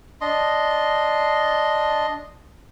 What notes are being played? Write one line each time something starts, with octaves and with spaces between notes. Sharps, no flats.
D4 D#5 C6